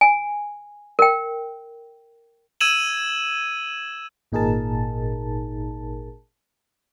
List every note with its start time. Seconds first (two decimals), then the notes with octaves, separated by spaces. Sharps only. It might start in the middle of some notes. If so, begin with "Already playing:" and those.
0.01 G#5
0.99 A#4 G5
2.61 E6 G#6 D#7 E7 F#7
4.32 G#1 A#2 D#4 G#4 A#4 A5